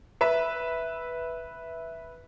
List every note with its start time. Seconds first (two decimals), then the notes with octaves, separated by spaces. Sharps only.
0.21 B4 E5